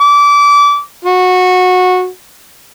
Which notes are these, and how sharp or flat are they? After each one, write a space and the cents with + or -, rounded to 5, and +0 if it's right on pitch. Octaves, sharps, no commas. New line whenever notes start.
D6 -25
F#4 -20